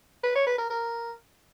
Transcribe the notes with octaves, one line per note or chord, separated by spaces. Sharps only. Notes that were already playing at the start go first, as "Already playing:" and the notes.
B4
C#5
B4
A#4
A#4